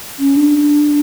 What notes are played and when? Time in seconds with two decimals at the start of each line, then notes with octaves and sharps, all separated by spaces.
0.19 C#4
0.36 D4